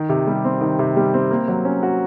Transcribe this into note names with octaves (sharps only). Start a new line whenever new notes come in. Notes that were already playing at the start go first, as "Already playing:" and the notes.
Already playing: D#3
C3
G3
C4
D#3
C3
G3
C4
A#3
F#3
C#4
F#4